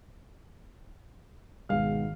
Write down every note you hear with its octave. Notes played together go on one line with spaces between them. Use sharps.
G#1 B2 G#3 D#4 F5 F6